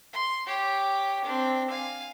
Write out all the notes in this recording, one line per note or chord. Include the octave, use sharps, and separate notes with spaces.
C6
G4 C#5
C4 D4
F5 G#5